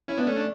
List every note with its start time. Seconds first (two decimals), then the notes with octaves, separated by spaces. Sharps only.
0.08 C#4 E4
0.17 B3 D4
0.26 A3 C#4
0.37 D4